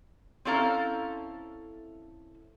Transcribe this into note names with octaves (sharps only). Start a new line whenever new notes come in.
C4 C#4 E4 A4 F5 A#5